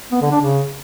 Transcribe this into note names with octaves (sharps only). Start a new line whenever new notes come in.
B3
D3
D4
C#3